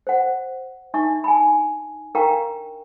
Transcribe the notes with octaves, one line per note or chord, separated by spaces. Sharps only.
C5 F#5
D4 D#4 E5 C#6
G#5 A5 B5
D4 A#4 F5 G5 A#5 C#6